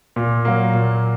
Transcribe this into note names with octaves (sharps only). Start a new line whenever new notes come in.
A#2
F#3 A#3
A#2